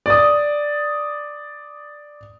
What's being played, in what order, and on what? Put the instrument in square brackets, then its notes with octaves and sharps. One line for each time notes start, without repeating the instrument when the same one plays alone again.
[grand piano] D5 D#6